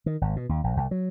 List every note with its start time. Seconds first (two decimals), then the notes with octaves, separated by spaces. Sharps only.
0.06 D#3
0.21 G#1
0.36 B2
0.49 D#2
0.64 A#1
0.77 C2
0.91 F#3